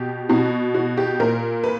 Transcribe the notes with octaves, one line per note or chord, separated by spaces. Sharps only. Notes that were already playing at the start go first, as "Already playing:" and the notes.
Already playing: B2 G4
B2 F#4
F#4
G4
A#2 A#4
B4